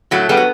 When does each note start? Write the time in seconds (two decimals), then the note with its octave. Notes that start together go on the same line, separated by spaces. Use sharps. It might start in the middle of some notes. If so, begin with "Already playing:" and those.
0.11 A2 F#3 A3
0.29 G3 B3
0.37 F#3